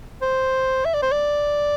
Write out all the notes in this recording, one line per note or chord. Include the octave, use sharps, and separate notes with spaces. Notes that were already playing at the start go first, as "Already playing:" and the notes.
C5
E5
D5
C5
D5